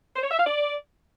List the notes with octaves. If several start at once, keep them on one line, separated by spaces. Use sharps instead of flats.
C5
C#5
E5
F5
D5